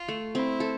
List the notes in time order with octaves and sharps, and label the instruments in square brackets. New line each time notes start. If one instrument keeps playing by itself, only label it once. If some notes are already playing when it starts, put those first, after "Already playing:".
Already playing: [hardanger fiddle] F4
[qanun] A3
[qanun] C4 [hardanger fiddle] E4
[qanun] A4